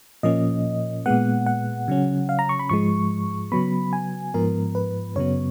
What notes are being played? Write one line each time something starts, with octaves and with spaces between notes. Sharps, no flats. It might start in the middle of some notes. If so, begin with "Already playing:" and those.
A#2 F3 A#3 C#4 D#5
A#2 G#3 B3 F#5
F#5
C#3 F#3 C#4
F5
A#5
C#6
B5
G#2 F3 G#3 C#6
C#3 F#3 B3 B5
G#5
G#2 F3 B3 A#4
B4
F#2 C#3 F#3 B3 C#5